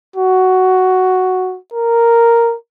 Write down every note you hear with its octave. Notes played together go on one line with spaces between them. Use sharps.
F#4
A#4